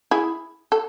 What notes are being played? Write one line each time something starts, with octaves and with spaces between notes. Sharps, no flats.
E4 G#4
A4